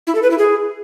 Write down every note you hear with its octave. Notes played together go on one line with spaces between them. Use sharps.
E4
A4
B4
E4
G#4